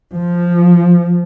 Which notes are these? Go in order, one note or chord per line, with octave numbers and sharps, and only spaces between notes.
F3